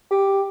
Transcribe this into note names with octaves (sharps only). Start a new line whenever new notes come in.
G4